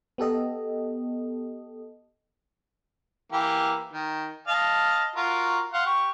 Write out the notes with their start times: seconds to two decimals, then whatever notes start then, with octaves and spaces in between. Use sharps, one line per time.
0.18 B3 G4 A4 D#5
3.32 E3 A#3 G4
3.93 D#3
4.47 D#5 F5 A5
5.16 F4 F#4 A#4
5.74 F5 F#5 C6
5.86 G4 C#6